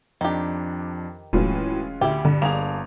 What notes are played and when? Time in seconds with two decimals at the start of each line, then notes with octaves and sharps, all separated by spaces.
0.21 F2 D#3 D4 G4
1.33 E1 A2 E3 F#3 G#3 C#4 F4
2.01 D2 E4 G4
2.25 G2 D3
2.42 G1 A#3 D4 G#4 F7